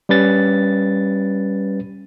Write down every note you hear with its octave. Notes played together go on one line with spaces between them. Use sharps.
G3 C#4 B4 A6